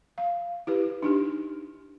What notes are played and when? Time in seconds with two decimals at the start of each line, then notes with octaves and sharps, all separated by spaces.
0.18 F5
0.67 E4 G4 B4
1.02 D4 D#4 G4